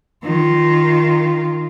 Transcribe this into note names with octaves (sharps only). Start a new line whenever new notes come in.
D#3 F4